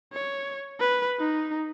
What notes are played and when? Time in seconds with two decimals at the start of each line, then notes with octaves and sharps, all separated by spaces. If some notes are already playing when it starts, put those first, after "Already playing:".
0.12 C#5
0.80 B4
1.19 D#4